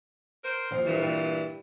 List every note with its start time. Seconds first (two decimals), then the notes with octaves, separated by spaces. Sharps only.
0.44 A#4 C5
0.71 D#2 F3
0.85 G2 A#2 E3
1.01 G3